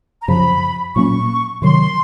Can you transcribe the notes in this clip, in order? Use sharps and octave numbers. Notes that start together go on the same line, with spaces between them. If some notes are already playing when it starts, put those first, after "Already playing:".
A#5
F#2 C#3 F3 B5
A#2 F#3 A#3 C#4 C#6
C3 D#3 F#3 C6